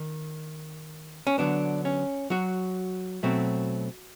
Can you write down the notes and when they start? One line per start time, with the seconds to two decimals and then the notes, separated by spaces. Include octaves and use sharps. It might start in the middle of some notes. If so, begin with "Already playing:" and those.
Already playing: D#3
1.27 C#4
1.38 D3 F#3 B3 D4
1.85 C#4
2.30 F#3 F#4
3.23 B2 F#3 A3 C4